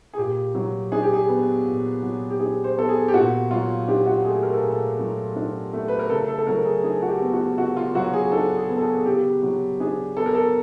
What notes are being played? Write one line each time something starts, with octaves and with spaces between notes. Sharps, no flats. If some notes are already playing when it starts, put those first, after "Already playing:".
G#4
A#2 G4
F#3
D4 G#4
G4
G#4
B3
A#2
F#3
G4
D4 G#4
C5
B3 A4
G#4
G4
A#2 F#4
F#3 F4
D4 G4
F#4
A3 G#4
A#4
A4
A#2 G#4
A4
F#3
D4
A3
B4
A#4
C#3 A4
A4
A4
F#3 A#4
G#4
D4 G#4
F#4
G4
B3
F#4
C#3 F#4
F4
F#3 F#4
G#4
D4 A4
G#4
B3
A4
G#4
G#4
C#3 G4
F#3
D4 G#4
B3 A4
A#4
A4